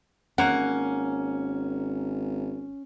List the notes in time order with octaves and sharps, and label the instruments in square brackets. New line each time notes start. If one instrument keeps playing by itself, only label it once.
[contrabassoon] G#1 [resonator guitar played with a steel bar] A#3 F#5 [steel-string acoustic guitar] C#4